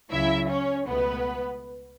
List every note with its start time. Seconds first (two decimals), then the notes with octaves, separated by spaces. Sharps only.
0.11 C#2 C#3 F#3 E4 E5
0.49 C#4 C#5
0.87 C#2 B2 A3 B3 B4